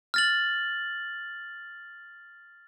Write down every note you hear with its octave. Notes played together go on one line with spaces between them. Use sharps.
F6 A6 F#7